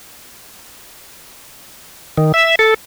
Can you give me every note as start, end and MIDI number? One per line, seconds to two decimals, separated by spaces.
2.17 2.32 51
2.34 2.55 76
2.59 2.74 69